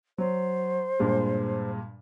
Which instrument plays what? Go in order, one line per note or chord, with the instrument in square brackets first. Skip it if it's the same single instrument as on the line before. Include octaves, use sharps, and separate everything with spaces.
[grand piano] F#3 [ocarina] C5
[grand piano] G2 A#2 G#3